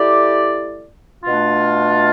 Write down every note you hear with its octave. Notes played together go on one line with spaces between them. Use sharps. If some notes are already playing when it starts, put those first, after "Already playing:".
Already playing: A3 E4 G4 D5
B2 A3 D4 F4